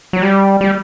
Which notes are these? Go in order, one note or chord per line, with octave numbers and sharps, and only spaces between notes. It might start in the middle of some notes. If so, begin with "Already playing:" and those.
F#3
G3
G3